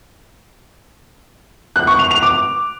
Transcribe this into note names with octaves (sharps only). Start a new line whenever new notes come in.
F#6
C#6
F7
F7
D6